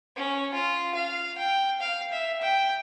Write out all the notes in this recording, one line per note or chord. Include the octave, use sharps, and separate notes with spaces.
C#4
F4
F5
G5
F5
E5
G5